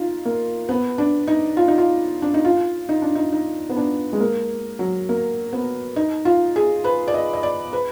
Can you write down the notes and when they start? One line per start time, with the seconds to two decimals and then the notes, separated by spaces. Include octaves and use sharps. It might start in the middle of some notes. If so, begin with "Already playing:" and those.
Already playing: D#4 F4
0.25 A#3
0.69 B3
0.98 D4
1.27 D#4
1.57 F4
1.68 D#4
1.78 F4
2.22 D4
2.34 D#4
2.45 F4
2.89 D#4
3.02 D4
3.15 D#4
3.32 D#4
3.70 B3
3.77 D4
4.13 G#3
4.20 A#3
4.79 F#3
5.09 A#3
5.53 B3
5.96 D#4
6.25 F4
6.56 G#4
6.84 B4
7.08 D5
7.14 D#5
7.33 D#5
7.43 D5
7.73 B4